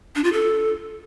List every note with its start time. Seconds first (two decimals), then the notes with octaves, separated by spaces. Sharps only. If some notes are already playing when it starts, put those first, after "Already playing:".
0.16 D4
0.24 F4
0.33 A4